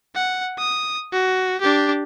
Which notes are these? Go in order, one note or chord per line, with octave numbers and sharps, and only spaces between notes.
F#5
D#6
F#4
D4 G4